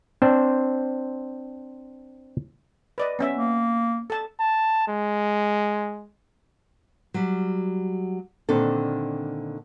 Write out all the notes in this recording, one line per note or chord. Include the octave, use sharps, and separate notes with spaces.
C4 D4 C5
B4 D5 D#5
B3 C#4 E5
A#3
A4 A5
A5
G#3
F#3 G3
A#2 D3 D#3 C4 D4 A4